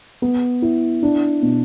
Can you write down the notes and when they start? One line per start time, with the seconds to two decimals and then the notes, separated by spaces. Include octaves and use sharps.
0.22 B3
0.62 E4
1.03 D4
1.42 B2